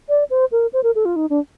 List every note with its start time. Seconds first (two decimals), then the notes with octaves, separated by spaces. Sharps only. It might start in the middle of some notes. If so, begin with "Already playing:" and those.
0.09 D5
0.30 C5
0.52 A#4
0.73 C5
0.83 A#4
0.95 A4
1.05 F4
1.16 D#4
1.30 D4